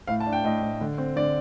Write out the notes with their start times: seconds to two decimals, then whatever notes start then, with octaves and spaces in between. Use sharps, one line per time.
0.07 A2 F5
0.20 A5
0.27 D4
0.33 G5
0.44 A2 D#5
0.62 A2
0.81 D3
0.98 C4
1.16 D3 D5